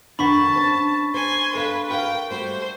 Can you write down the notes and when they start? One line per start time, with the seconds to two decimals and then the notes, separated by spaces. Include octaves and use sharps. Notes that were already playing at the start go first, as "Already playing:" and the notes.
0.19 F2 D#3 D4 F#5 A5 B5 C#6 B6
0.56 C#4 D4 C5 A6
1.14 C5 G#5 C6
1.55 A4 B4 E5 F5
1.90 F#4 A#4 F5 G5
2.31 G3 A3 F#4 C5